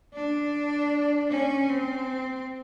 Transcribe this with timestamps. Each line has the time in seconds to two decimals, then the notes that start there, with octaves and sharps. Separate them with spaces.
0.13 D4
1.30 C#4
1.70 C4